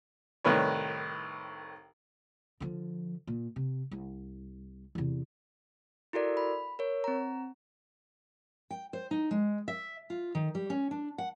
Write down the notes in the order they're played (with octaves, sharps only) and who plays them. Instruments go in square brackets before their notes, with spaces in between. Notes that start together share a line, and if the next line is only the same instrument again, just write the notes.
[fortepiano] C2 A2 D#3 B4 C#5
[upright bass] D3 F3
A#2
C3
C2
E2 C3
[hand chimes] E4 F#4 A4 A#4 D5
B5
A#4 C#5
C4 A#5
[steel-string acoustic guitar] G5
C5
D#4
G#3
E5
F4
D#3
G3
C#4
D4
F#5